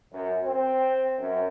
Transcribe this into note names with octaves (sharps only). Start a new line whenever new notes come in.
F#2
C4
F#2